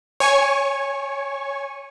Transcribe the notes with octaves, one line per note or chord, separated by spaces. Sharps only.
C#5 G#5 C#6